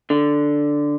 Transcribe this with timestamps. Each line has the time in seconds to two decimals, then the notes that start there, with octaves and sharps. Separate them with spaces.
0.10 D3